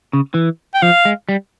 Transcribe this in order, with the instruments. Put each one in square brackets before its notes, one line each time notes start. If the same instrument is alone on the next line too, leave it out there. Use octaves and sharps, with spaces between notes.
[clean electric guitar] C#3
E3
[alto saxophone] G5
[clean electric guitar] F3 [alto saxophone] F5
[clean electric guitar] G#3
G3